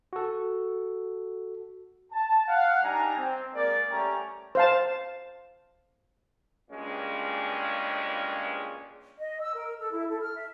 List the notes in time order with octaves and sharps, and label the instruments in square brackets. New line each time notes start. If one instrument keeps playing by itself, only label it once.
[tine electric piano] F#4 A4
[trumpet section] A5
F5 F#5
G3 D4 D#4 G#5 A#5
C4
G#3 A#3 A#4 D5
G3 A3 C#4 G4 D5 A#5
[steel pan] C5 F5 A5
[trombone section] C#2 G2 A#2 G#3 C#4
[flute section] D#5
E6
A#4
A4
E4
A4
F6
E5